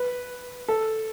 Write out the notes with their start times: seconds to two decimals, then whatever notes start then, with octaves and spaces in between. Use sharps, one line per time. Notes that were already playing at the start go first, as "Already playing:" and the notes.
Already playing: B4
0.68 A4